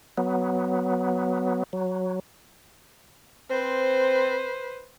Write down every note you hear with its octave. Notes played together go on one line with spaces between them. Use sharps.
F#3 B3
F#3
C4 B4 C5